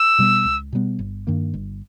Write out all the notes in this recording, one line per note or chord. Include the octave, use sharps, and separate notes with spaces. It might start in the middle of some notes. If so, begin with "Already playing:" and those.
Already playing: E6
B2 G3 B3
C#2
B2 G3 B3
G1
G2 D#3 A#3
G1